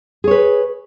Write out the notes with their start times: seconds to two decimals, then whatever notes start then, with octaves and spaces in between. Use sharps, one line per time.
0.24 G#4
0.28 C#5
0.31 B4